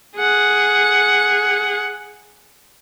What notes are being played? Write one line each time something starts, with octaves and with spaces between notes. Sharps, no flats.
G#4 F#5